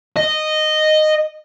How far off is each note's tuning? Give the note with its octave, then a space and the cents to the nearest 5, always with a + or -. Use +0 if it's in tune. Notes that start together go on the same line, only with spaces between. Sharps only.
D#5 -10